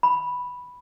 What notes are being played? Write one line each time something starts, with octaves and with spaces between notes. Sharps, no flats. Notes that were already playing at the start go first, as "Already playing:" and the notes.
B5